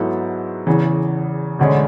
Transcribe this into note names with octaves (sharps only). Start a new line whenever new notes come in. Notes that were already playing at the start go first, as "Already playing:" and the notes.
Already playing: G#2 F#3 B3 E4 A4
E2 C#3 E3
E1 D2 D3 G#3 C#4